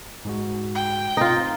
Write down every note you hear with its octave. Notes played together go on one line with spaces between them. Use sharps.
G#2 G#3 F#4
G5
C4 D#4 F4 A#6